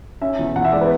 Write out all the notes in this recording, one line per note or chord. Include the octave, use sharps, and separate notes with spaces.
C#4 E5
E2
E2 F#5
E5
G#3 D5
B4